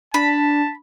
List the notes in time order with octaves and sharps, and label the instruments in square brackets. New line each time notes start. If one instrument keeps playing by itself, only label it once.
[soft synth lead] D4 [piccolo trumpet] A5 [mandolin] B5